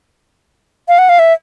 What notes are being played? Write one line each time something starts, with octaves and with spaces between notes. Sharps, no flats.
F5
F#5
F5
E5